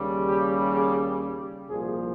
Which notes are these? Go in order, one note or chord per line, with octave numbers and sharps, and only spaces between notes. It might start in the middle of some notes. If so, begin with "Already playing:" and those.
Already playing: D#2 C#3 G3
G4
G#4
G4
C2 A#2 F3 G#4